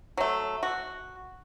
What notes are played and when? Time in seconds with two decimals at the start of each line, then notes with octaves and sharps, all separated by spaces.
0.17 F#3 A3
0.63 F#4